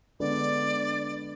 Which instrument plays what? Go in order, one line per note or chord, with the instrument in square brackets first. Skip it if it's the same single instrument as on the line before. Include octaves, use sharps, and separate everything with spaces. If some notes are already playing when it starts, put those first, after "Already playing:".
[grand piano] D3 G#3 B3 D4 [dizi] D5